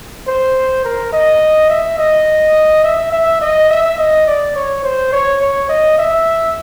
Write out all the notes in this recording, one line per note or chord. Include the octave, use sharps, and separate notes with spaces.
C5
A#4
D#5
E5
D#5
E5
E5
D#5
E5
D#5
D5
C#5
C5
C#5
C#5
D#5
E5